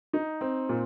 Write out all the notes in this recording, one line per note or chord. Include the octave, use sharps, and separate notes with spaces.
D#4
C4
A#2